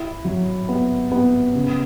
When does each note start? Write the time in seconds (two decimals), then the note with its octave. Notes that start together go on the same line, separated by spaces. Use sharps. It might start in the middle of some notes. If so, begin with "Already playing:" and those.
Already playing: E4
0.25 F#3
0.69 B3
1.12 B3
1.55 C#3